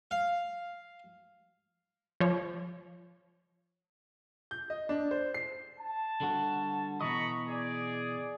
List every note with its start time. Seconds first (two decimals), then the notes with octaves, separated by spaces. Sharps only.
0.11 F5
2.20 F3 C#5
4.51 G6
4.70 D#5
4.89 D4
5.11 C5
5.34 C7
5.80 A5
6.21 D3 G3 F#4
7.01 B2 E3 D#5 A#5 B5 C#6
7.49 G#4 D5